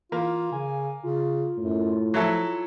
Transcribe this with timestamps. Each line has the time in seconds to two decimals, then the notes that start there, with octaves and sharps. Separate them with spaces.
0.12 E3 A#3 F4
0.52 C#3 G#5
1.04 C#3 F4
1.57 F#2 A2
2.14 F3 F#3 E4 A4